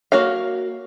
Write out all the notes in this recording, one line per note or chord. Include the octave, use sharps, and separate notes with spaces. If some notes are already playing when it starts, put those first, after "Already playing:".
A#3 F#4 C#5 F5